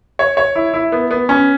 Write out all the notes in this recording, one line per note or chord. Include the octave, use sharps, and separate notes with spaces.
C#5
C#5
E4
E4
B3
B3
C#4